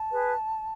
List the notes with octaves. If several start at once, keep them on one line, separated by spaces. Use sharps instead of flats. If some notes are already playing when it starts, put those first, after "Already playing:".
Already playing: A5
G#4 B4